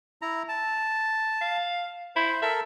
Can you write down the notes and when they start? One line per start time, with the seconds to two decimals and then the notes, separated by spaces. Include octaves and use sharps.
0.22 E4 A#5
0.48 A5
1.41 F5
2.16 E4 C5
2.42 A4 A#4 E5